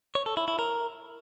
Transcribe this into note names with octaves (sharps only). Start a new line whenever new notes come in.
C#5
A4
E4
E4
A#4